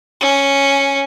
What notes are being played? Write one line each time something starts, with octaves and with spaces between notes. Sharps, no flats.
C#4